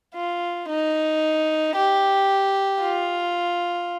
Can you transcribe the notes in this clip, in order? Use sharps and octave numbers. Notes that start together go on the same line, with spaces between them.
F4
D#4
G4
F4